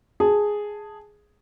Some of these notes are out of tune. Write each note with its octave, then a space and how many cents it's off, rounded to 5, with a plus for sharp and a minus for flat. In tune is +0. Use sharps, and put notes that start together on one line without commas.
G#4 +0 A5 +0